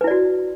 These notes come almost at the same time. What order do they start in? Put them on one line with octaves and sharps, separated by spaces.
B4 E4 D5 F#4